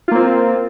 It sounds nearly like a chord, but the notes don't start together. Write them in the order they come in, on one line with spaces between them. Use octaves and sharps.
F4 A#3 C4